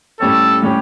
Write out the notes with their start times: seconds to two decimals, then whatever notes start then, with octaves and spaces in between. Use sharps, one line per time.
0.20 A2 G3 C#4 G4 A4 C#5
0.62 A2 G3 C#4 G4 C#5